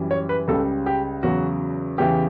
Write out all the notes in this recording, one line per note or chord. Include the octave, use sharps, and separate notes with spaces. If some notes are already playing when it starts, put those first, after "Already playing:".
Already playing: F#2 E3 G3
C#5
B4
C#2 C#3 G3 A4
G4
E2 C#3 F#3 F#4
E2 C#3 E3 G4